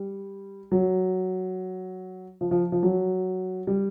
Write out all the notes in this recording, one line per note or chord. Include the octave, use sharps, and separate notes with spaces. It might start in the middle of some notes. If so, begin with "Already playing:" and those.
Already playing: G3
F#3
F3
F3
F3
F#3
G3